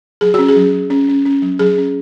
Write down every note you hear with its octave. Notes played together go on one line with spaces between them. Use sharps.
F#3 G#4
C#4 F#4
G#4
F#3
F#3
C#4
C#4
C#4
F#3
F#3 G#4
C#4